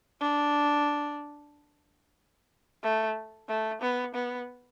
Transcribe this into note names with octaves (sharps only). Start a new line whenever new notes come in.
D4
A3
A3
B3
B3